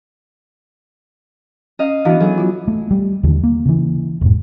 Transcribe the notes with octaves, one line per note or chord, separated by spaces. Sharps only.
C#4 D#5 F5
E3 B3 D4 F#4 F5
F#3 G#4 A4
F4 F#4
A3
G3
D#2 D3 E3
A#3
C#3 E3
E1 G#2